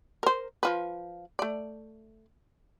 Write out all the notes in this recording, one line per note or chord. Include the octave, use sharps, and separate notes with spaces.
A#4 C5
F3 F4 B4
A3 D5